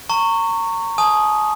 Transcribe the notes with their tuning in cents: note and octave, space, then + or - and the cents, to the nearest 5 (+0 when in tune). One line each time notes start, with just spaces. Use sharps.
A#5 -35 C#6 +0
G#5 +45 D#6 +0